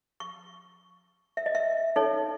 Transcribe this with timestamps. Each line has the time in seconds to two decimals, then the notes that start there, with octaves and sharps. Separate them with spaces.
0.20 C#6
1.37 E5
1.46 D#5
1.55 E5
1.96 D#4 A4 C#5